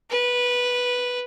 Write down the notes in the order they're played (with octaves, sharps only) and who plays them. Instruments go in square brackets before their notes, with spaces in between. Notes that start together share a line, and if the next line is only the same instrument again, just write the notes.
[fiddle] B4